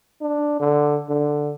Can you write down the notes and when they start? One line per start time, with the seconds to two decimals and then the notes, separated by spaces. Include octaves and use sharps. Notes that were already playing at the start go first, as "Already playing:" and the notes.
0.21 D4
0.60 D3
1.09 D3